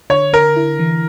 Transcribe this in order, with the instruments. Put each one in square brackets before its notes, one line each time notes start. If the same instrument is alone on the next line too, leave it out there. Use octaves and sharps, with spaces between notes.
[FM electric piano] D3 [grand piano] C#5
[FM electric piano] D3 [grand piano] A#4
[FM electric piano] E4
E3